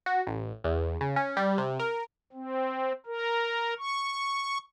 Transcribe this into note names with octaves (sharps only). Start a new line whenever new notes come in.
F#4
A1
E2
C#3
C#4
G3
C3
A#4
C4
A#4
C#6